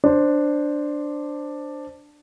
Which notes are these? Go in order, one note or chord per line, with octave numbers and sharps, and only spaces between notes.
D4 C5